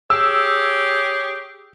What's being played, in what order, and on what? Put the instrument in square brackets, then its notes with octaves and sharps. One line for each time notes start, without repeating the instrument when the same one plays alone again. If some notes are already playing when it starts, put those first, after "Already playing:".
[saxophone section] G4 G#4 C#5 [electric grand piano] E6